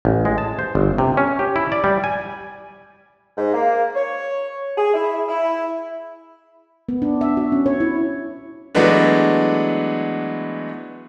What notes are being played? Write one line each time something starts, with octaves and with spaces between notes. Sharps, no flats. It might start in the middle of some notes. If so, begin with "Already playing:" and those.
A1
G#3
A5
C5
G1
C3
C#4
G4
E4
D5
G3
G#5
G#2
A#3
C#5
G#4
E4
E4
B3
D4
E5
F#4
C#4
C#5
E4
E3 F#3 G#3 A3 B3 D4